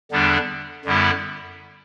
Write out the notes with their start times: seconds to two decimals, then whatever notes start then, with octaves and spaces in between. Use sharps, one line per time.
0.12 E2 D3 G3 B3 D4
0.85 F#2 D3 G3 B3 E4